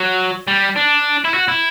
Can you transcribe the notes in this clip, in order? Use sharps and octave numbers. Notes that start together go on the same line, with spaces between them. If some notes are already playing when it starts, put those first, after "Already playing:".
Already playing: F#3
G3
D4
E4
F#4
E4